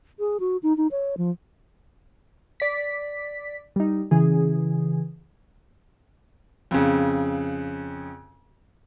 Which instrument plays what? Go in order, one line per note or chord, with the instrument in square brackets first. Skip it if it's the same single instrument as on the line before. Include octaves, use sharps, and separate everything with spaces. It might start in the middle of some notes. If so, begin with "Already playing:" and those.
[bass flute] G#4
F#4
D#4
D#4
C#5
F3
[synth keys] D5 B6
G3 D#4
C#3 E3 G#4
[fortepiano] F2 C#3